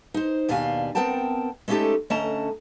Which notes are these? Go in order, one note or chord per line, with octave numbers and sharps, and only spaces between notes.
D#4 C5
D#2 B2 D4 G4 F5 G#5
B3 C4 A#4 F#5 G5 A5
G#3 A3 C#4 D#4 G4 A4
D3 A3 C#4 D#5 A5 A#5